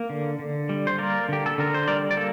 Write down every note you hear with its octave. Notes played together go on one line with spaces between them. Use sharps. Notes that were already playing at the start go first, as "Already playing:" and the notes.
Already playing: A#3
D3
D3
G3
C5
A#3 A#4 D5
D3 G4
A4
D3 A#4
C5
G3 A#4 D5
D5
A#3 A4